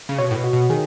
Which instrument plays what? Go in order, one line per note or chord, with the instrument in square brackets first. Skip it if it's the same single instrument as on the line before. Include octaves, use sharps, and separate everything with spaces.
[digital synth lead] C#3
[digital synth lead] B2 [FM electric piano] C#5
[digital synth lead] A2
B2
[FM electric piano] F#4
[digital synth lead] B2
[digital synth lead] D#3 [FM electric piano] G#4